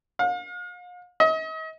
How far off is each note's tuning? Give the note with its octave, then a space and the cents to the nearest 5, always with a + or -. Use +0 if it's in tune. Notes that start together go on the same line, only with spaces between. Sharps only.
F5 +40
D#5 +40